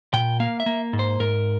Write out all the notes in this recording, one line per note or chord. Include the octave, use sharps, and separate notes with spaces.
A#2 G5
A#3 F5
E5
A#3
G#2
C5
G#2 A#4